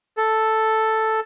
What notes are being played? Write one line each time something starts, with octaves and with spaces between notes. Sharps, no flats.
A4